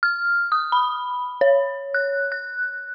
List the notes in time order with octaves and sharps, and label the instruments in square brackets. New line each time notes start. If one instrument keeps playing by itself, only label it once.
[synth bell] F6
D#6
B5
C#5
F#6
F#6